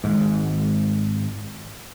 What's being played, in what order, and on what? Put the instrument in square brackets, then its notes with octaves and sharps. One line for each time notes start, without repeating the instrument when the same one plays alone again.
[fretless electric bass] G#1 G#2